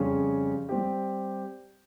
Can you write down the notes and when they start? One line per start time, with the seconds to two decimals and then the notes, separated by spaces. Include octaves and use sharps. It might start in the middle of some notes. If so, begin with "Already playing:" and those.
Already playing: F2 C#3 G3 C#4 G#4
0.69 G3 C4 G4